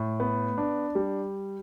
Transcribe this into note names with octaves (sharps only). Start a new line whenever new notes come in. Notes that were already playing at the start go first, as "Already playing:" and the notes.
Already playing: A2
B3
D4
G3